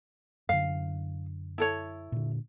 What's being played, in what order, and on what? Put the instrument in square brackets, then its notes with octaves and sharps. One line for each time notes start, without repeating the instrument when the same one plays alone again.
[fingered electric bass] F#2 D3 [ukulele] F5
[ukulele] E4 A4 C#5
[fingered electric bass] A#2 D3